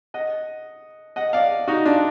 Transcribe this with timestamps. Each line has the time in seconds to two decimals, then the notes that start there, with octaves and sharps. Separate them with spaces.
0.14 D#5 F#5
1.16 D#5 F#5
1.33 D5 F5
1.68 D#4 F#4
1.85 D4 F4